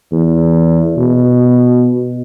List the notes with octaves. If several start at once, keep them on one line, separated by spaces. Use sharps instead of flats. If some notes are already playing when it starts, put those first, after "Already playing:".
E2
B2